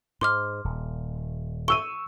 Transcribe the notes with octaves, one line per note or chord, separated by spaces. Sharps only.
G#2 C6 D6 F6
D#1
C#6 E6 D#7 G7